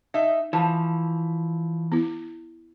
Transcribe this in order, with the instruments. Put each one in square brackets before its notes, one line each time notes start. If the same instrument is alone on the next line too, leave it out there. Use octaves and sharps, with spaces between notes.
[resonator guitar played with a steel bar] D#4 E5
[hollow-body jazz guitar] E3 [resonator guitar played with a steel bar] F3
[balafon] B3 E4